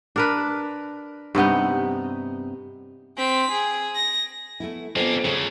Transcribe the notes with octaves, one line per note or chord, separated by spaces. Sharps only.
D4 A#4 B4
G2 C3 B3 D#4
C4 B6
G#4
A#6
A3 B3 E4
F2 A#3 B3 D4 G#5
E2 C#3 G#4 C5 C#5